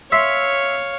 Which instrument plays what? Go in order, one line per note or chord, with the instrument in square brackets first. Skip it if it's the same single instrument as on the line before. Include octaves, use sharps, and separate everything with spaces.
[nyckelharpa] C#5 F5 [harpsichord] E5 C6